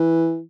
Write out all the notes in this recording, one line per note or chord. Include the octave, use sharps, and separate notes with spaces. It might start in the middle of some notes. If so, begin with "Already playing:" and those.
Already playing: E3